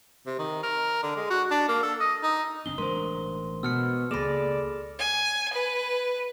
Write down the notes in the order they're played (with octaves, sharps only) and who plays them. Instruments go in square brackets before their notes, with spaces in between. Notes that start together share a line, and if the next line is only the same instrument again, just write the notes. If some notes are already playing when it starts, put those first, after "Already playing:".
[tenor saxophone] C3
D#3
A#4
D3
G#3
F#4
D4
A#3
A4
D#5
D#4
[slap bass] F#1 C4 D4 [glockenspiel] G7
[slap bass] A1 G#3 D4 [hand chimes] A#4 C5 [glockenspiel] C6
[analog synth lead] B2 [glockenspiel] E6 F6 C#7
[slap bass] C#2 A#3 [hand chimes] G#4 A4 B5 [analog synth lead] D5 [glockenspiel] A#6 E7
[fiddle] G#5
B4